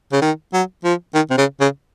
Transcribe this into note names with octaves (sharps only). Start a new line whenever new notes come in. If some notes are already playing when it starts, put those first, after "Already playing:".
C#3
D#3
F#3
F3
D#3
C3
C#3
C#3